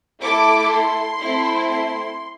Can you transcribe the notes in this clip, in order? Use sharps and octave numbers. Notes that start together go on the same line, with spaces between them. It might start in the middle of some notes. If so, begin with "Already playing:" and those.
A3 E4 A4 D6
C6
A3 C4 E4
C6